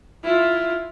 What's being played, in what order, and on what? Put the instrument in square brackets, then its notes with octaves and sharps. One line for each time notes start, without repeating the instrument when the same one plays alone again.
[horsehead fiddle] E4 F4